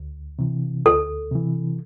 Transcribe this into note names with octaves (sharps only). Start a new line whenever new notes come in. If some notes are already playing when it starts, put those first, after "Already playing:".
Already playing: D2
C3 E3
D2 A4
C3 E3